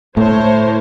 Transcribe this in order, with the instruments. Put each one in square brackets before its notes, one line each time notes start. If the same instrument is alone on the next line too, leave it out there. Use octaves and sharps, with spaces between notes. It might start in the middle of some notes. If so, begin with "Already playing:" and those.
[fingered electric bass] A2 [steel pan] A3 [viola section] C5 C#5